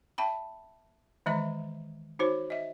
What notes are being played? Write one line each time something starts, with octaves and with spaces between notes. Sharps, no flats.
E5 G5 A5 B5
D#3 E3 G#3 D#5 E5 A#5
D#4 F#4 C5 C#5
D#5 E5